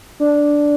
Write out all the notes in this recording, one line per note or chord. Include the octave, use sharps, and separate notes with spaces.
D4